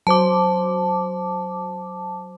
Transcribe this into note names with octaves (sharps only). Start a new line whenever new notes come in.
F#3 C5 A5 D6